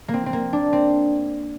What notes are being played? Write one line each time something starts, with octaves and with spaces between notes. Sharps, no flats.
A#3
C4
C4
A#3
D4
C4